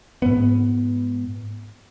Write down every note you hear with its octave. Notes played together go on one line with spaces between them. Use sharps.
G#2 B3